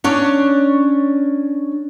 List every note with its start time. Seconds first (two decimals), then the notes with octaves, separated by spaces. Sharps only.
0.04 C#4 D4 C#5